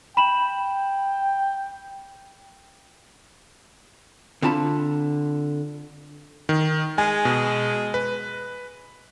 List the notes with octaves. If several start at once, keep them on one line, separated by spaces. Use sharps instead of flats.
G5 B5 E7 F#7
D3 C4 F4 A5 B5
D#3
G#3 G#5
B2
B4